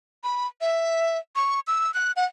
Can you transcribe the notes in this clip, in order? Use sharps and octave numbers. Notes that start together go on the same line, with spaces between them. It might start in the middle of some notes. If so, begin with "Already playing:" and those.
B5
E5
C#6
E6
F#6
F#5